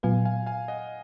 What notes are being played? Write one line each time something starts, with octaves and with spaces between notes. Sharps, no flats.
A#2 F#3 B3 F4 B4 F5 G#5
F5 G#5
F5 G#5
D#5 F#5